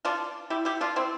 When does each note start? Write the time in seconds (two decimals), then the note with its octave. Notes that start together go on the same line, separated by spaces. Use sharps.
0.05 D4 F4
0.50 E4 G4
0.65 E4 G4
0.81 D4 F4
0.96 C4 E4